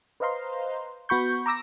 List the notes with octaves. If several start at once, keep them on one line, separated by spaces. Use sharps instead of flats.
B4 C5 D#5 F5 A#5 C6
B3 F#4 B5 C#6 G6
A#5 D6 E6 A#6